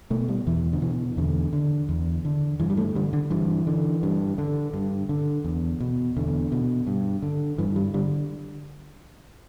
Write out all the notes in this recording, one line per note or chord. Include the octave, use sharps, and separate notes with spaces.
B2 A3
G3
E2 E3
D3
B2 E3
E2 D3
D3
E2
D3
G2 E3
G3
A3
D3 G3
D3
G2 E3
D3
G2
D3
G2
D3
E2
B2
E2 D3
B2
G2
D3
G2 E3
G3
D3 G3